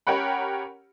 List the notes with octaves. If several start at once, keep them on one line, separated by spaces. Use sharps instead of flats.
C#4 G4 A#4 C#5 F#5 B5